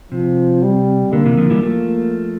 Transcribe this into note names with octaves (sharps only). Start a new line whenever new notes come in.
C3 F3
G3
D3 A#3
C3 E3
D3 F3
E3 G3
F3 A3 A#3